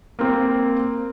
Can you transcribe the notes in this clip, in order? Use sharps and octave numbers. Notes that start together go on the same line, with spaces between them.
A#3 C4